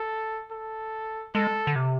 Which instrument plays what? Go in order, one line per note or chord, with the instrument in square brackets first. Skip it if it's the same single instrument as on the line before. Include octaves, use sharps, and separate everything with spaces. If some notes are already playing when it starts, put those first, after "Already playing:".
Already playing: [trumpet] A4
A4
[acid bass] G#3 [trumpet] A4
[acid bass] D3
C3